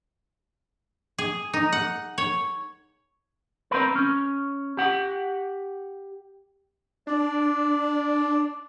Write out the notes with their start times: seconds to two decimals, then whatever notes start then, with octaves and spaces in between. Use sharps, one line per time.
1.18 G#4
1.54 D#4
1.73 F#5
2.18 C#5
3.71 C4 A#4 B4
3.96 C#4
4.77 G4 F#5
7.07 D4 D5